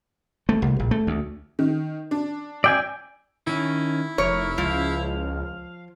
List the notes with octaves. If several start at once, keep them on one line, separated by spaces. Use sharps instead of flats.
A3
C2
A#1
A3
D2
D#3
D4
D5 G5 G#5 E6
D#3 C#4 E4
F1 A#4 C#5
C#2 F3 F5